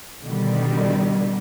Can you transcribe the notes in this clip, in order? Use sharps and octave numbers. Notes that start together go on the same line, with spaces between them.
B2 D3 D#3 G3